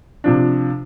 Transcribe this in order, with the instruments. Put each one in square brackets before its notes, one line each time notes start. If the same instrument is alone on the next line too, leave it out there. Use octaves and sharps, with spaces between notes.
[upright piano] C3 F3 D4